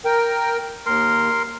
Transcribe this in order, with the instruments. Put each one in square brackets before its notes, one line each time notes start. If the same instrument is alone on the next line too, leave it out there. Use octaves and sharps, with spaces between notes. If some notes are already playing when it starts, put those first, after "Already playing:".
[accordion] A#4 G5
[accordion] D#2 [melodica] A#4 C6